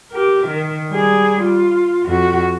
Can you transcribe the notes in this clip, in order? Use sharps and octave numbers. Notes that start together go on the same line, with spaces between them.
G4 A#4
D#3
G3 G#4
F4
F2 F#4